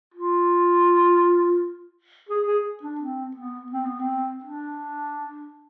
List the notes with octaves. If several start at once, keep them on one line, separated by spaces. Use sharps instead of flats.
F4
G#4
G#4
D4
C4
B3
C4
B3
C4
D4